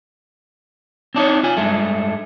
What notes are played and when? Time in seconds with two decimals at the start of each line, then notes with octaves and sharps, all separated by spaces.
1.15 C4 D4 D#4 C#5
1.43 F4 G#5
1.57 G2 C3 G#3 A3